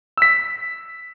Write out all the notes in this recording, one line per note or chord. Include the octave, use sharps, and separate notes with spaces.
E6 B6